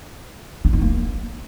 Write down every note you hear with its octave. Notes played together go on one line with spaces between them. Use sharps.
D4
D#4
A#3